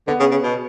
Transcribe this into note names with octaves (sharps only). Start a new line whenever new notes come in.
D3 B3
C#3
C#3
B2